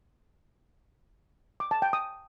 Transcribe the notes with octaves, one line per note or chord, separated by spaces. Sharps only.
D6
A5
G5
D#6